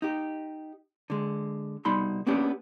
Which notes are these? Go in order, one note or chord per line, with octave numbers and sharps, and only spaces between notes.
D#4 G4
D3 G#3
C2 B2 G3 D#4 B5 C6
A#3 B3 C#4 D4 G4